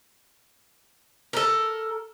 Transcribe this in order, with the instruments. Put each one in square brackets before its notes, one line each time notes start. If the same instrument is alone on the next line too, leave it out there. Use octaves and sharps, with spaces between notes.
[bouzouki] A4 A#4